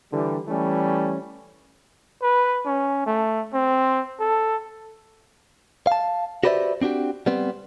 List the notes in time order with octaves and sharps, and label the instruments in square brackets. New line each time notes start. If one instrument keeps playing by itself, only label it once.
[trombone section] D3 E3 G3
E3 G3 A3 C#4
[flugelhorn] B4
C#4
A3
C4
A4
[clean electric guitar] F5 A5
F#4 G4 B4 C5 D5 E5
C4 D4 F#4 G4
G3 B3 C4